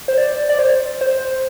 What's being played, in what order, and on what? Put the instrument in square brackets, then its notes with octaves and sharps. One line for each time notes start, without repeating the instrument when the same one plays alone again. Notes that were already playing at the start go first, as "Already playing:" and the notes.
[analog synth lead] C5
D5
D5
C5
C5